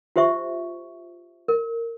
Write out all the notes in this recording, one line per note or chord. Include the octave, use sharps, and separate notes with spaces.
F4 G4 C5 E5 C#6
A#4